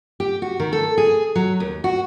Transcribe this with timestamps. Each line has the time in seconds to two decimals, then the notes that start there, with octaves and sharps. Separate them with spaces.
0.20 G4
0.42 F#4
0.60 D#3
0.73 A4
0.98 G#4
1.35 F#3
1.60 D#2
1.84 F#4